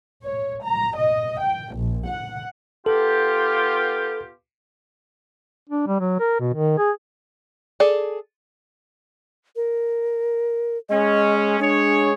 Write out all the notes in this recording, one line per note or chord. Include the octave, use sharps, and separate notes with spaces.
C#5
A#5
D#5
G5
A#1
F#5
B3 F4 G4 A4
D4
G3
F#3
A#4
B2
D#3
G#4
G#4 A4 D5
A#4
G#3 C#4 D#5
G#3 D4 G#4 C#5